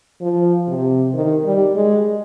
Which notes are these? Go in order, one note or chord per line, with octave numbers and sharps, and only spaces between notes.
F3
C3
D#3
G3
G#3